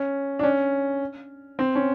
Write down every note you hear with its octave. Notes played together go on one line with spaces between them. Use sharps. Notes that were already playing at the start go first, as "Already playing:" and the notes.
Already playing: C#4
D4
C#4
C4
C#4